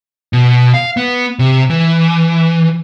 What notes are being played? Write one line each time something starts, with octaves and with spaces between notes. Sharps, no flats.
B2
F5
B3
C3
E3